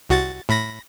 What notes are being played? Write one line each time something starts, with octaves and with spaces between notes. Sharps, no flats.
C2 F#4 A6
A2 B5 A#6